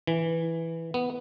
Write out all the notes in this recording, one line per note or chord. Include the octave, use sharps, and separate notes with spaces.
E3
B3